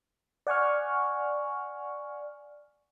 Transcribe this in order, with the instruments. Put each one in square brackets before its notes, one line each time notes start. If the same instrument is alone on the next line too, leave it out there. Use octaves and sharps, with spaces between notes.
[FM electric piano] D5 F#5 G#5 C#6 F6